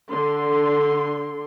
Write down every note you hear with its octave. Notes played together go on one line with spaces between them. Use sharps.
D3 C6